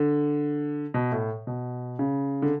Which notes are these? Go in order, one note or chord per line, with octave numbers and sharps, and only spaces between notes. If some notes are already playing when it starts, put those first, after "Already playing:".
Already playing: D3
B2
A2
B2
C#3
D3